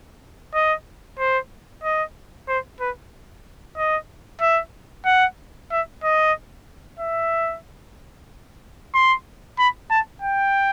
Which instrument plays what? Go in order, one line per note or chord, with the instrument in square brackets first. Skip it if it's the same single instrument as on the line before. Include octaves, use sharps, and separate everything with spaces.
[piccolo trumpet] D#5
C5
D#5
C5
B4
D#5
E5
F#5
E5
D#5
E5
C6
B5
A5
G5